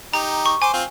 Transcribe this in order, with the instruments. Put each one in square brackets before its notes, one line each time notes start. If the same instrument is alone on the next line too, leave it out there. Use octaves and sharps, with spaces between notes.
[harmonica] D#4 G4 [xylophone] A#5
[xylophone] C#6
[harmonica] C5 D6 [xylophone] G#5
[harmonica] C4 F4